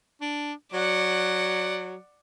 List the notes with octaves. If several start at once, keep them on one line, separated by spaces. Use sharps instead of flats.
D4
F#3 D5 F#5